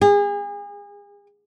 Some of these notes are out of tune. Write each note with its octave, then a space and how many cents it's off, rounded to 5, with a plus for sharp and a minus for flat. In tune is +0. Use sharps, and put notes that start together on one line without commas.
G#4 -35